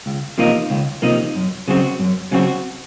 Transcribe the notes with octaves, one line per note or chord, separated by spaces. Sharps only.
C#2
C3 F3 A#3 D#4
C#2
C3 F3 A#3 D#4
F#2
C#3 F#3 C4 F#4
F#2
C#3 F#3 C4 F#4